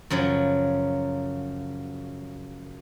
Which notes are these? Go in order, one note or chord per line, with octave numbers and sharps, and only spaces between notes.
F#2 C#3 F3 F#3